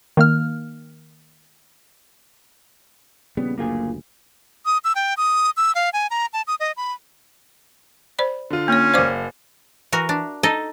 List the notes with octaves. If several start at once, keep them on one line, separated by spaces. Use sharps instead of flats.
D#3 A#3 F6
A#1 C#3 G3 B3
F#1 D2 A#3 F4 G#4
D#6
E6
G5
D#6
E6
F5
G#5
A#5
A5
D#6
D#5
B5
C5 D5 B5
D3 F4
A#3 C#4 C#5
F#1 C5 D5 F5 D6
E3 F#4 A#4
D4
D#4 A4 D#5